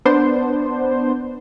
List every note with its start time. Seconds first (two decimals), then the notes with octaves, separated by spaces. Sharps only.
0.05 B3 D4 C5